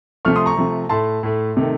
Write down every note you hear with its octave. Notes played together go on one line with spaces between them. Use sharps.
C3 F3 A3 C#6 F6
C6 D#6
A#5 C#6
C3 F3 A3
A2 A3 A5 C6
A2 A3
C3 D#3 A3